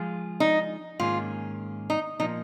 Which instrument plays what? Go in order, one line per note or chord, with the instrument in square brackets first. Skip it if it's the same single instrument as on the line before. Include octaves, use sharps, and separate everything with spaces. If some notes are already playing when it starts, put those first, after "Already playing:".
Already playing: [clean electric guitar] F3 G#3 F4 G#4
[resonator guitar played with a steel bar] D#4
[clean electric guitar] G#2 D#3 A#3 C#4 G#4 [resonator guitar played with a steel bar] F4
[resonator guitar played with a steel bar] D#4
[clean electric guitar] A#2 F3 A#3 [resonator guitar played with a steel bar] D#4